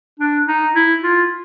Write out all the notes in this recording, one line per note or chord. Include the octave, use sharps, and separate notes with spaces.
D4
D#4
E4
F4